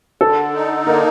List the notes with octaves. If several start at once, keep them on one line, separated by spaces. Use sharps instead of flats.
D3 A4
D#4
A#3 A#4